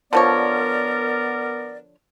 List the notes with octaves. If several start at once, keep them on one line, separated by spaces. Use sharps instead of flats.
D3 F3 B3 A#4 C#5 D5